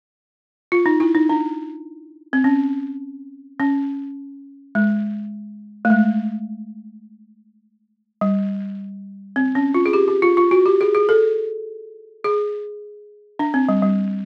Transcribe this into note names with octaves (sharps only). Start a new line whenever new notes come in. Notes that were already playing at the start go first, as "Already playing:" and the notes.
F4
D#4
E4
D#4
D4
C4
C#4
C#4
G#3
A3
G#3
G3
C4
C#4
F4
G#4
G4
G4
F4
F4
F#4
G4
G#4
G#4
A4
G#4
D4
C4
G3
G3